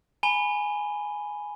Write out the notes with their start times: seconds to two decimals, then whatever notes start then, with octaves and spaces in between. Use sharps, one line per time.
0.23 G#5 A#5 B5 D#7 G7